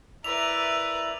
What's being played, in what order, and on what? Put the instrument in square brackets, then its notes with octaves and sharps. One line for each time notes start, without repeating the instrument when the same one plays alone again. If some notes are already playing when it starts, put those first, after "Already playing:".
[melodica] E4 D5 [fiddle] A#4 B4 [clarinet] E5 [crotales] F7